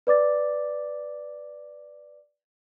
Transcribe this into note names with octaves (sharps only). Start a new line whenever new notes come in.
B4 D5 D6 A6